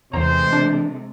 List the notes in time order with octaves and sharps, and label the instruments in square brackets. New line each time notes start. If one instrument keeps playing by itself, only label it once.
[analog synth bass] E2 [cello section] C3 G#3 A3 [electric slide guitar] E3 A#5 [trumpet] C5
[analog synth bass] D4